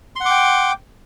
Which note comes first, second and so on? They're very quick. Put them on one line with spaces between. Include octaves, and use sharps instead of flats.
C6 F#5 D6 G5